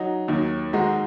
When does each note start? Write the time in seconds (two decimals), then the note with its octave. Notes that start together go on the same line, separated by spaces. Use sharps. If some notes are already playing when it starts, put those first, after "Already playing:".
Already playing: F#3 D#4 F#4
0.28 D#2 D#3 F#3
0.73 G#2 D#3 G#3 D#4 F#4